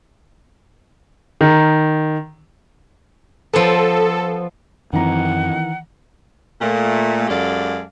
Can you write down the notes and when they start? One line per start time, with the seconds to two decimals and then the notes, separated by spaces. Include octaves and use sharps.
1.41 D#3
3.53 F3 B3 A4
4.93 F#2 D#3 E3 F#3 C4 F#5 A#5
6.61 A#2 A3
7.28 F#2 G#3 G4 A4 D5 F5